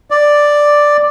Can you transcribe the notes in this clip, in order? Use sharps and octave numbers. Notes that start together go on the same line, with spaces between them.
D5